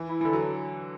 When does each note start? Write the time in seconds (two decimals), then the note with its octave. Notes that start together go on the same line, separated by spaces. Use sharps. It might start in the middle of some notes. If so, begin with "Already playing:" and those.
Already playing: E3
0.09 E4
0.21 E3
0.25 D3 A4
0.33 F#3